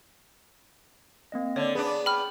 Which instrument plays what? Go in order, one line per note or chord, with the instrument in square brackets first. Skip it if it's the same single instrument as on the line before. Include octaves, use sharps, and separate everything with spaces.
[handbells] A#3 C4 D#5
[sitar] D3 [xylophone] C#5 [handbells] D5
[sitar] B3 D4 [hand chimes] G#4
[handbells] G5 [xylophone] B5 F6